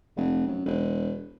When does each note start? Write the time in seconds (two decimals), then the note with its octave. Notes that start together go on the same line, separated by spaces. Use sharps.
0.16 F1
0.46 F#2
0.66 E1